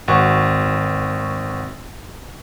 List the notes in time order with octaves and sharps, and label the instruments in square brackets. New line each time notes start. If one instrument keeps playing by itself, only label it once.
[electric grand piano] G#1 F#4 C#6